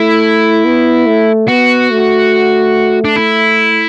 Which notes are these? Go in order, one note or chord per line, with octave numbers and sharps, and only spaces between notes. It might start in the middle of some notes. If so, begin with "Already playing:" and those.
Already playing: A3 E4
B3
A3
B3 F#4
A3
D4
E4